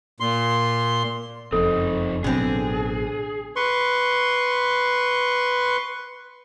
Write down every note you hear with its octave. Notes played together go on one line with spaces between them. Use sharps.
A#2 C6
F#1 F2 C4 D#4 A4
A1 B2 D3 F#3 C4 G#4
B4 C6 C#6